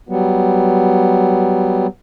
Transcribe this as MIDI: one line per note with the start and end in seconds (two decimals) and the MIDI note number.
0.09 1.87 54
0.09 1.87 55
0.09 1.87 59